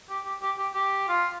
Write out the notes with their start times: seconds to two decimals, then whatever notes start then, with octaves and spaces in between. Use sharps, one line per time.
0.09 G4
0.25 G4
0.42 G4
0.58 G4
0.74 G4
1.08 F4